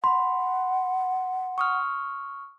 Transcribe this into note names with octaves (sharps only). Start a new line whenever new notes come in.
F#5 B5 C6
C#6 D#6 F6